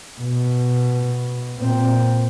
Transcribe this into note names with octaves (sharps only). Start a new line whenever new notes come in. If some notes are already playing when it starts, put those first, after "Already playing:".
B2
A#2 C4